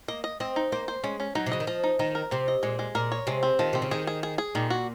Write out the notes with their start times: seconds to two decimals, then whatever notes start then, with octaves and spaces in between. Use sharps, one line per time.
0.08 A#3 D#5
0.24 D#5
0.40 C4 D#5
0.56 D#4
0.72 A#3 C5
0.88 C5
1.04 G#3 C#4
1.20 C#4
1.35 F#3 D#4
1.46 C3
1.52 C#3 D#5
1.60 D#3
1.67 F3 D#5
1.84 D#4
1.99 D#3 D#4
2.15 A#4
2.31 C3 C4
2.48 D#5
2.63 A#2 G#3
2.79 G#3
2.95 A#2 A#4
3.12 C#5
3.27 C3 G#3
3.43 C4
3.59 D#3 F3
3.73 C3 C4
3.82 C#3
3.91 D#3 G#4
4.07 G#4
4.23 G#4
4.38 G#4
4.55 A#2 D#3
4.70 F#4